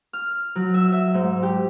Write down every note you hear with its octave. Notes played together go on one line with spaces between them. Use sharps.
F6
F#3
E5
E5
G#2
G4